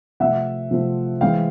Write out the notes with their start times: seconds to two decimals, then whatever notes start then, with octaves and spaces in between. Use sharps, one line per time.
0.20 C3 F3 A3 C4 E5 F#5
0.71 C3 F3 A3 C4
1.21 E3 G#3 C4 F5 G5